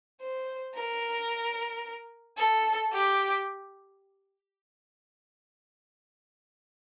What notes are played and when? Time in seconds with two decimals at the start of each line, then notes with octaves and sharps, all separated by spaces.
0.21 C5
0.75 A#4
2.37 A4
2.92 G4